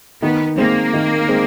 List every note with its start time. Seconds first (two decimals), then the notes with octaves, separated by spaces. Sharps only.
0.22 D#3 B3
0.58 G#3 A#3 C4
0.93 D#3
1.29 G#3 C4